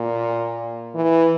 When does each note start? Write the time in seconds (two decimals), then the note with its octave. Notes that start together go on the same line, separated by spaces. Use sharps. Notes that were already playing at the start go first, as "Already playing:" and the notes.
Already playing: A#2
0.95 E3